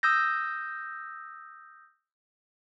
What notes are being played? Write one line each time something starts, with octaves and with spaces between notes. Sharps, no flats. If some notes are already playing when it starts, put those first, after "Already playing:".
D#6 E6 G6 A#6